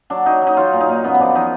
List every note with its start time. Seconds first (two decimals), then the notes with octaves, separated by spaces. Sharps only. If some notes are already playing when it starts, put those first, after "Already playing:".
0.10 F#3 D4
0.26 F#3 D#4
0.42 F#3
0.47 D#4
0.57 F#3 F4
0.73 A#2
0.81 D#4
0.89 A#2
1.04 F#2 B3
1.14 B3
1.20 F3 D4
1.35 F3 D#4